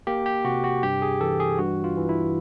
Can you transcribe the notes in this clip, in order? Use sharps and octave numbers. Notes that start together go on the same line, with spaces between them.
A#3 G4
G4
C3 F#4
F#4
G2 G4
G#4
E3 A4
G#4
G2 F#4
F4
E3
E4